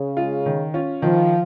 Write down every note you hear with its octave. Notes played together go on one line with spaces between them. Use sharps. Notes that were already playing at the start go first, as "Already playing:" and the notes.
Already playing: C#3
G#3 F4
D#3
C#4 F4
D#3 F3